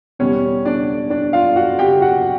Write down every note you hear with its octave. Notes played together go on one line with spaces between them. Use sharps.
E2 B2 G3 C#4 C#5
D4 D5
D4 D5
F4 F5
F#4 F#5
G4 G5
F#4 F#5